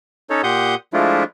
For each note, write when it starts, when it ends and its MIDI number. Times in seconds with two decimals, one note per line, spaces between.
0.30 0.42 61
0.30 0.42 63
0.30 0.42 69
0.30 0.42 73
0.44 0.75 46
0.44 0.75 67
0.44 0.75 78
0.44 0.75 84
0.44 0.75 87
0.44 0.75 91
0.93 1.24 53
0.93 1.24 56
0.93 1.24 57
0.93 1.24 62
0.93 1.24 64
0.93 1.24 65